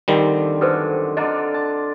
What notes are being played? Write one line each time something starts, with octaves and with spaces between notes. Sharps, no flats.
D3 D#3 F3 G3 C4
F#2 D3 A4 B4 C5
D3 D4 F4 D#5 A#5
A5